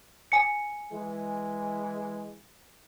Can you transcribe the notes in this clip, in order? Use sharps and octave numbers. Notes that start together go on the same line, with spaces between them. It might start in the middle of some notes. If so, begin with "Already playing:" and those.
G#5 C#7
E3 G#3